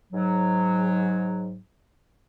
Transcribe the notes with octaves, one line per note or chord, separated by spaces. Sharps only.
G#2 F#3